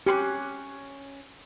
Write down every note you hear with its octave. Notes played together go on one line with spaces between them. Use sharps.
C#4 G4 C6 F#6